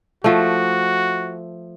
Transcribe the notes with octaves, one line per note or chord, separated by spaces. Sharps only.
F3 A3 F#4